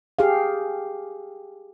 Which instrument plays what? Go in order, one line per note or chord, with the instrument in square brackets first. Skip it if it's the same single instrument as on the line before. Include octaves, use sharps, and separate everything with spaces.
[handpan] G4 G#4 F5